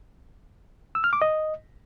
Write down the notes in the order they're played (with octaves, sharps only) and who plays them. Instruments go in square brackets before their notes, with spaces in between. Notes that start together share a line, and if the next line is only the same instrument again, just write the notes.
[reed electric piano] E6
F6
D6
D#5